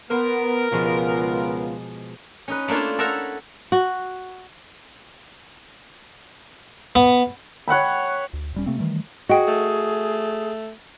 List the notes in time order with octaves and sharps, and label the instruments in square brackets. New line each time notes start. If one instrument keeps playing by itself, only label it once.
[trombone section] B3 [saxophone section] A#4 [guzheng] C5
[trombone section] C#2 B3 F4 [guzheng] B2 F3 G#3
[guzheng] C#4 D#4 B4
A3 A#3 D4 E4 F4
A4 A#4 C#5 E5 F#5 A#5
[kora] F#4
[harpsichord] B3
[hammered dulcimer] C#5 F#5 G5 B5
[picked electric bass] D2
E1 G3 C#4
C3 A3 A#3 C4
D#3 E3 G3 A3
[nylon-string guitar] F#4 [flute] G#4 [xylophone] D#5 G5
[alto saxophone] A3